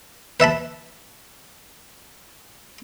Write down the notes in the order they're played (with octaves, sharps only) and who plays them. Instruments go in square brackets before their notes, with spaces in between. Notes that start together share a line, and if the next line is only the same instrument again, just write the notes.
[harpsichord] B4 E5 A5 B5